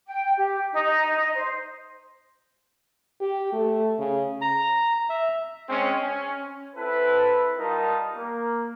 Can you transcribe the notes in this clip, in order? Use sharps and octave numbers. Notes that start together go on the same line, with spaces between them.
G5
G4
D#4
D#5
C5
G4
A3
C#3
A#5
E5
G#3 C4 C#4
C#4
C4 E4 A4 B4
G3 D#4 F4 A#4 A5 A#5
A#3